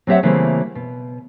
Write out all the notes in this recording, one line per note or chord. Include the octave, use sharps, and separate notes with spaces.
F#3 C4 G4 C#5 E5 F#5
C#3 E3 G3 A3 A#3 C4
B2